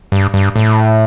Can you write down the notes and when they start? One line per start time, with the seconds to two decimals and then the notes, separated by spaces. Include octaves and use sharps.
0.12 G2
0.34 G2
0.56 A2